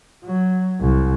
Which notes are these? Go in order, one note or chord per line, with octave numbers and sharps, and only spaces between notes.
F#3
C2